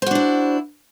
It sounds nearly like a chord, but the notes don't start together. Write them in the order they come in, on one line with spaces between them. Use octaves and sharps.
C5 F#4 D4 E4